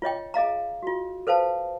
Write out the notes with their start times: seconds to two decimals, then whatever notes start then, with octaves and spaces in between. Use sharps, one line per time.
0.02 F4 C#5 D#5 G5
0.34 G#4 D#5 F5 A#5
0.83 F4 F#4
1.27 A4 B4 C5 F5 A5